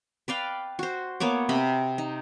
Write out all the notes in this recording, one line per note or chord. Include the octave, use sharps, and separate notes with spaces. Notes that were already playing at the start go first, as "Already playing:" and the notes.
B4 D5 F5 G5
F#4 C5
A#3 B3 C#5 D6
C3 D#5 B5
D#4